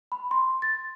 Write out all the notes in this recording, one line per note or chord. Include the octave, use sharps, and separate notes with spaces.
B5
C6
A6